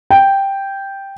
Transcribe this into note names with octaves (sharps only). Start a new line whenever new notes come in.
G5